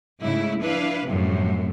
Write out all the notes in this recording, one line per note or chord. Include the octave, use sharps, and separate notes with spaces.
G#2 C#3 A3 E4
F3 D4 E4 B4 F5
F#2 A2 C3 F3 G3 A3